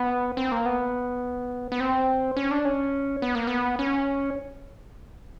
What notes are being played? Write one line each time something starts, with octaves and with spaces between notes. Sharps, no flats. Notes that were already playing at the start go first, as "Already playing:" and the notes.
Already playing: B3
C4
A#3
B3
B3
C4
C#4
D4
C#4
B3
A#3
B3
C#4